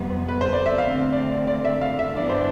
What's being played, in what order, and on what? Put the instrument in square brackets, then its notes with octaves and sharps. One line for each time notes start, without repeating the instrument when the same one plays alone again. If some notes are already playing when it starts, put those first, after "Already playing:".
Already playing: [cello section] F2 C3 G3 B3
[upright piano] B4
C5
D5
E5
[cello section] D3 A3 C4 [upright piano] F5
[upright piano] D5
D5
E5
F5
E5
[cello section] G2 E3 B3 D4 [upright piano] D5
[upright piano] C5